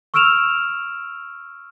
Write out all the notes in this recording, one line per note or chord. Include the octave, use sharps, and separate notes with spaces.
C#6 E6 F6 D7 E7 F7